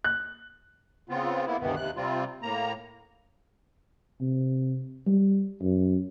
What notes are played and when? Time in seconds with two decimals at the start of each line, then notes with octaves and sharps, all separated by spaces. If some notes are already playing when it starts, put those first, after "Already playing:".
0.04 F#6
1.09 C#3 B3 C4 F4
1.46 A#3 B3 E4
1.60 D2 G2 C3 D#3 E3 B3
1.76 D#2 C3 F#6
1.96 C3 G3 C4 F4
2.42 A2 A#3 A#5
4.21 C3
5.07 G3
5.62 F#2